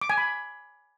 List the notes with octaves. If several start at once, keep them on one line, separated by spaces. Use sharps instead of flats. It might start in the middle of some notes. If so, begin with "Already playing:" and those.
D6
G#5
B5